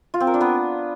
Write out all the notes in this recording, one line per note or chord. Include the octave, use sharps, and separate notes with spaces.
F4
C4
A#4
D4
B3